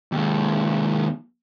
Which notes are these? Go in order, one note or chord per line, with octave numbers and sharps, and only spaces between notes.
D#2 G#3